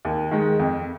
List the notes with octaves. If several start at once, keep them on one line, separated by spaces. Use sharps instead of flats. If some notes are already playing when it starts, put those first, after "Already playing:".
D#2
D#3 G#3
F2